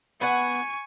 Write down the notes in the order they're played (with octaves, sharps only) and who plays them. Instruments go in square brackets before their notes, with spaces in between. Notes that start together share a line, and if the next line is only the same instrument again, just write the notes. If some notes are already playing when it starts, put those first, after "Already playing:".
[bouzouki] B3 F#5 [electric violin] G#5 C#6